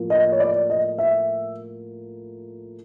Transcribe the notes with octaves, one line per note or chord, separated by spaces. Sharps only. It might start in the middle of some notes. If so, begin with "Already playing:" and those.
Already playing: A2 F3 A#3
D#5
C#5
D5
D#5
E5